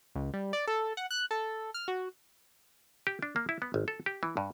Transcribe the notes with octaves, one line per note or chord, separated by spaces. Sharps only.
C#2
G3
D5
A4
F#5
F#6
A4
F6
F#4
G4
D4
A#3
E4
B3
G#1
A4
G4
E3
G2